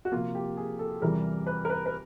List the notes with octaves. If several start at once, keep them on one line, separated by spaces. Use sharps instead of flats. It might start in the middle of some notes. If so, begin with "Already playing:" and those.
F#4
C3 F3 A#3 F4
G4
G#4
A4
E2 C3 E3 G3 A#4
B4
A#4
B4
B4